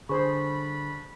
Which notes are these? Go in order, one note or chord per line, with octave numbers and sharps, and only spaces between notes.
D3 G3 D4 G#4 C5 B5 C#6